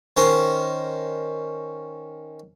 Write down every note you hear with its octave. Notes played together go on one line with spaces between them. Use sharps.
D#3 C#4 A#4 C5